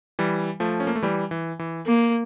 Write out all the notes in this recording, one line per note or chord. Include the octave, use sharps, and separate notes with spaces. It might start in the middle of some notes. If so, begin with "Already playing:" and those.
E3 G3
F3 A3
C#4
A#3
A3
E3 G3
E3
E3
A#3